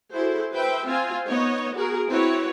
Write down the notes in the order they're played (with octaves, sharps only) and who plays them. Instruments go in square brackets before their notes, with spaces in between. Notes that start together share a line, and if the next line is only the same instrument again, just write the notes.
[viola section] E4 F#4 G#4 A4 C5
B4 C5 E5 G5
C4 F4 C5 G#5
B3 D#4 C#5 D#5
F#4 G#4 A#4
C4 E4 F#4 B4 C#5